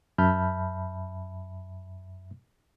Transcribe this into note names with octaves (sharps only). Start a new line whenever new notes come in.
F#2 E5 A5 B5 F6 G6